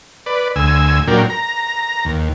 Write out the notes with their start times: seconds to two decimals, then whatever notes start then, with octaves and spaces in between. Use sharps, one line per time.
0.26 B4 D5
0.56 D2 G#5 E6
1.08 A#2 F#3 D4 A#4 G5
1.30 A#5
2.05 D#2